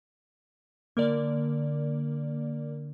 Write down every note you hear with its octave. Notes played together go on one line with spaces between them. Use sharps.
D3 A#3 A#4 D5